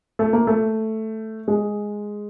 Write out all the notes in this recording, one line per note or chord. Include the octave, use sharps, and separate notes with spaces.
A3
A#3
A3
G#3